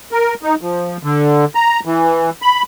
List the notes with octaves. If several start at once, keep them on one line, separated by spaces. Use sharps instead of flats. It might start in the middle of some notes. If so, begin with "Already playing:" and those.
A#4
D#4
F3
D3
A#5
E3
B5